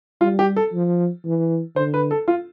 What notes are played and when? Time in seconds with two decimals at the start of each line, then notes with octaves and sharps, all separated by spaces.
0.21 G3 F4
0.39 G4
0.56 A4
0.73 F3
1.25 E3
1.76 D3 C5
1.94 B4
2.11 A4
2.28 F4